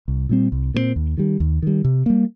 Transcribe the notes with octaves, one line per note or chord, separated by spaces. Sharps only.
C2
A#2 G3 C4
C2
A#2 G3 C4
D#2
D#3 G3
D#2
D#3 G3
C3
G3 A#3